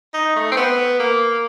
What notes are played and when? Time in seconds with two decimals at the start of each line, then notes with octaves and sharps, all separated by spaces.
0.14 D#4
0.36 A3
0.52 C4
0.57 B3
0.99 A#3